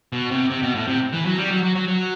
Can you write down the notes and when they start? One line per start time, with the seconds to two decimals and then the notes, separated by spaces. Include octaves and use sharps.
0.13 B2
0.31 C3
0.50 C3
0.62 B2
0.75 A2
0.88 C3
1.13 E3
1.25 F#3
1.38 G3
1.50 F#3
1.63 F#3
1.75 F#3
1.88 F#3